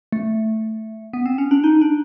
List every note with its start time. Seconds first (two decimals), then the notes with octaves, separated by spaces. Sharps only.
0.12 A3
1.13 B3
1.26 C4
1.38 C#4
1.51 D4
1.64 D#4
1.81 D4